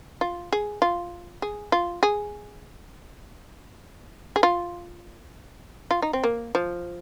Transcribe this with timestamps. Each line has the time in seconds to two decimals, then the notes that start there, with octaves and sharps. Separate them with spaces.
0.21 F4
0.52 G#4
0.82 F4
1.42 G#4
1.72 F4
2.03 G#4
4.36 G#4
4.43 F4
5.91 F4
6.02 D#4
6.13 C4
6.24 A#3
6.55 F3